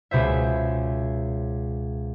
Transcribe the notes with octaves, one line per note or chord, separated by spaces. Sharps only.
C#2 B2 C5 E5